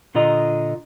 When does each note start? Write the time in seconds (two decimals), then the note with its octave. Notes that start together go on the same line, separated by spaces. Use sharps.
0.15 A#2 D3 F4 D#5 A#5